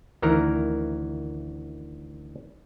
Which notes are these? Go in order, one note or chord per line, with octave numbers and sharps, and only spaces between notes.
D2 D#3 E3 A#4 A#5